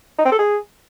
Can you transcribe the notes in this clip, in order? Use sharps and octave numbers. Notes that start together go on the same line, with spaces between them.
D#4
C4
A4
G#4